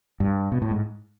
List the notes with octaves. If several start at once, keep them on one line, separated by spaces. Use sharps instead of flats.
G2
B2
A2
G#2